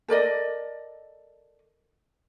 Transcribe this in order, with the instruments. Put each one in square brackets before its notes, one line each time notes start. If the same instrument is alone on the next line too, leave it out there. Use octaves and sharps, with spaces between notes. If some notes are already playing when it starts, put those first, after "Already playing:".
[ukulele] A4 A#4 D5 D#5